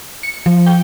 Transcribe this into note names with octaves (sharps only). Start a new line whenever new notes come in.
C#7
F3
G5